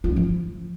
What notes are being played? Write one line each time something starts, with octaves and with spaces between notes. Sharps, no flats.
F4
C#4
F3